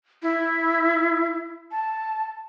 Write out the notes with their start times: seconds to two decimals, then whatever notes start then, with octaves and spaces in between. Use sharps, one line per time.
0.22 E4
1.71 A5